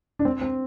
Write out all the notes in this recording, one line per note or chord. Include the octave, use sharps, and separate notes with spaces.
D4
C4
C4